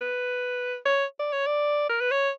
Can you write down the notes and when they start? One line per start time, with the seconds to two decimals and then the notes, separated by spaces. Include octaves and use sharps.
0.01 B4
0.86 C#5
1.20 D5
1.32 C#5
1.47 D5
1.89 A#4
2.01 B4
2.11 C#5